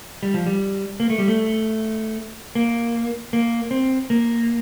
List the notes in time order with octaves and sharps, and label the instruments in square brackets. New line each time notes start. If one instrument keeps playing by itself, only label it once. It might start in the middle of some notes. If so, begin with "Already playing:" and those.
[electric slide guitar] G3
F3
G3
A#3
A3
G3
A3
A#3
A#3
C4
A#3